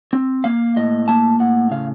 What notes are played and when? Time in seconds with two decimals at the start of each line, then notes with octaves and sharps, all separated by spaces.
0.13 C4
0.44 A#3 F5
0.76 A2 D#5
1.08 A#3 A5
1.39 A2 F#5
1.71 C#3 F5